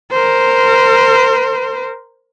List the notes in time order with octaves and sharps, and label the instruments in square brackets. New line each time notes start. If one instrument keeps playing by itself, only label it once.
[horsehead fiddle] A#4 C5